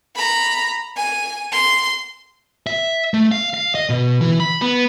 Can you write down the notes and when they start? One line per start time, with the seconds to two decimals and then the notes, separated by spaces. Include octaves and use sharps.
0.16 A#5 B5
0.97 G#5
1.52 C6
2.67 E5
3.14 A3
3.31 F5
3.54 F5
3.75 D#5
3.90 B2
4.21 E3
4.40 B5
4.62 B3